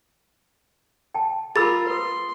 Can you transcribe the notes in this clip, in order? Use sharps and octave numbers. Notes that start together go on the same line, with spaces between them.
G5 A5
F4 G#4 A#4 B5 E6 A6
B4 C6 D#6